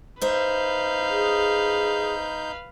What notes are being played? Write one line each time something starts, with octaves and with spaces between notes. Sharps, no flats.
D#4 B4 C5 E5 F5 G6
G#4